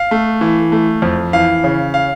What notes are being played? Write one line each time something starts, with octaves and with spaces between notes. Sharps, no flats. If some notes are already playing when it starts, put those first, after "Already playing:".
Already playing: F5
A3
E3
A3
F2
E3 F5
C#3
F5